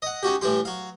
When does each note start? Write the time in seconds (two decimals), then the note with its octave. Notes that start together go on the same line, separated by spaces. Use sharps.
0.02 D#5 F#5
0.23 C#4 D#4 F#4 G4
0.41 A2 E3 G3 G4 C6
0.65 F#3 F5